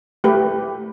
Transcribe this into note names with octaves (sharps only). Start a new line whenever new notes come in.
A3 G4 B4